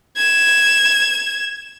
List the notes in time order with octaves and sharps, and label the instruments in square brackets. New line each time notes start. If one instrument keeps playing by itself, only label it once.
[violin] G#6 E7